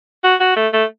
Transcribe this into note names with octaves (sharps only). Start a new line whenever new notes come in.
F#4
F#4
A3
A3